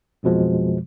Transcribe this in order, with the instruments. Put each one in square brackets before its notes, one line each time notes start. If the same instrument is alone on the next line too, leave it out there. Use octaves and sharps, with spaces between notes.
[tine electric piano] B1 F2 B2 F3 G#3